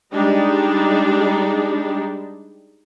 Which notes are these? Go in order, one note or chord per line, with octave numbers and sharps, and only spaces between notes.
G3 G#3 D4 D#4